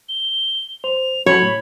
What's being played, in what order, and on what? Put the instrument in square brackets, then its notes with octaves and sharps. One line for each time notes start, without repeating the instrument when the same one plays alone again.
[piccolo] G7
[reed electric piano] C5 [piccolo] F7
[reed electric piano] F#3 C#4 A4 [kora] C#5 [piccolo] B5
[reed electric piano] A2